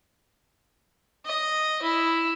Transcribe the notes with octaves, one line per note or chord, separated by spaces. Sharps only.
D#5
E4